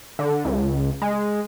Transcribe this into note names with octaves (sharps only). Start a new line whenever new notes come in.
D3
C#2
G#3